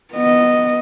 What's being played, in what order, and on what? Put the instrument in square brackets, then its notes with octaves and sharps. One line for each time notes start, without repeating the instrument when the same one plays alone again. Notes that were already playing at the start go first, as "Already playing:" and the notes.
[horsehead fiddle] B3 D#5